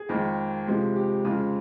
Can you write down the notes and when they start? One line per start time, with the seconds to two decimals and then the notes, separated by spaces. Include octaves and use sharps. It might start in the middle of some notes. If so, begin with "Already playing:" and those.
Already playing: G#4
0.09 F2 D#3 G#3
0.67 C3 F3 G#3
0.96 G4
1.25 F2 C#3 G#3 F4